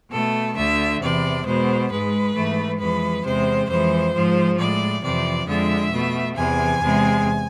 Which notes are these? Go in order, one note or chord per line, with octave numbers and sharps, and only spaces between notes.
B2 A3 A4
D2 D3 A3 E5
E2 C3 E3 D5
B2 G#3 C5
G#2 G#3 B4
G#2 E3 A3
F2 E3 G#3 B4
E2 C3 G#3 C5
F2 E3 G#3 C5
G#2 F3 G#3
A2 G#3 D5
F2 C3 E3 D5
F2 D3 G#3 E5
B2 A3
E2 C3 E3 G#5
E2 C3 G#3